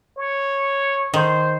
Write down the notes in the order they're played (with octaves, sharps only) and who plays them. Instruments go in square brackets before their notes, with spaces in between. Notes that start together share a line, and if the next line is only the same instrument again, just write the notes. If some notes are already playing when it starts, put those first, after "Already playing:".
[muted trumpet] C#5
[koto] D#3 [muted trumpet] C5